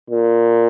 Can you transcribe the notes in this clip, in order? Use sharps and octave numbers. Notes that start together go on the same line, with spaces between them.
A#2